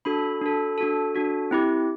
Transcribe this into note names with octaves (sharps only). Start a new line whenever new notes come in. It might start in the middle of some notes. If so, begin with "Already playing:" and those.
D4 F#4 A4 B5
D4 F#4 A4
D4 F#4 A4
D4 F#4 A4
C4 E4 G4